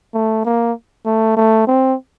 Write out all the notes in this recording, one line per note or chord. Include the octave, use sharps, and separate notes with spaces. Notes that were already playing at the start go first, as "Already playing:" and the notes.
A3
A#3
A3
A3
C4